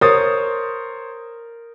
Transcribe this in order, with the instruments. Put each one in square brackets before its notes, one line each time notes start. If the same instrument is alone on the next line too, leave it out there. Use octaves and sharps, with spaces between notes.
[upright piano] A#4 D#6 [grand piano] C5 C#5 A6